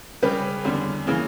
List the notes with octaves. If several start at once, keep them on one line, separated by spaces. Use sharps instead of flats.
C#3 G3 C#4 G4 B4
E2 D3 G3 C#4
C#3 E3 A#3 C#4